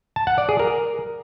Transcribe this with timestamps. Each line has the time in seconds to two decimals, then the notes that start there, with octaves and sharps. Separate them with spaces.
0.16 A5
0.27 F#5
0.38 D5
0.49 G#4
0.59 A#4